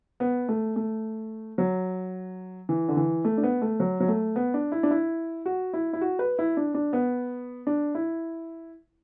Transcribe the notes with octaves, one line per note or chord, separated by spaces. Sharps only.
B3
A3
A3
F#3
E3
D3
E3
A3
D4
B3
A3
F#3
F#3
A3
B3
D4
E4
D4
E4
F#4
E4
E4
F#4
B4
E4
D4
D4
B3
D4
E4